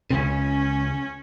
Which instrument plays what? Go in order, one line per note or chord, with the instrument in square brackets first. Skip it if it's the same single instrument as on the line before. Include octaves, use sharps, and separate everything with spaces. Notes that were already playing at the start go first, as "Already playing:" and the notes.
[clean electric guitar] C#2 C#3 [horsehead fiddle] C#4